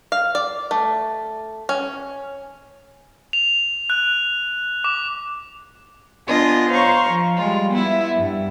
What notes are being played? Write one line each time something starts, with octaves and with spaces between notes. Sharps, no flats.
F5
D5
A3
C#4
F7
F#6
D6
B3 D4 F4 D#5 G#5
C5 C#5 F5 A#5 C#6
F3
G3 G#3 F4
B3 E4 E5
G2